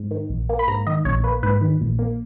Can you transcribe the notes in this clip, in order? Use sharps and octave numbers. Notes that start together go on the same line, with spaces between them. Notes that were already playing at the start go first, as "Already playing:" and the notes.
Already playing: G#2
D#3
A#1
A#3
B5
G#2 A#5
D#3 D#5
A#1 C#5
A#3 B4
G#2 B4
D#3
A#1
A#3